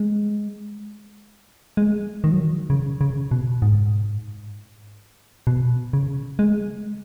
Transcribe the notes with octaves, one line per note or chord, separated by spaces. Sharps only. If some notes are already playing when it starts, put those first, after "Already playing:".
Already playing: G#3
G#3
D#3
F#3
D#3
C#3
C#3
B2
G#2
B2
C#3
G#3